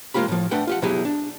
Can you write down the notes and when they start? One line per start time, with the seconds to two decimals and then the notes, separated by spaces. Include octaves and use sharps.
0.14 G#3 A#3 F4 G4 B5
0.28 A2 F3
0.51 A3 D4 B4 F#5 G5
0.67 F4 G4 F#5
0.82 B2 F#3 E4 G4 G#4
1.05 D4